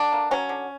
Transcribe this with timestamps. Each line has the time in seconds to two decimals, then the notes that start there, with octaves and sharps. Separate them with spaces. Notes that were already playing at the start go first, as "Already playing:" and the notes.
Already playing: D3 D4
0.12 A#3
0.31 F#3 C#4
0.49 D3